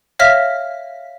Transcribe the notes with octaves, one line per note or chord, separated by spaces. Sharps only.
C#5 E5 F5 F6 A#6 B6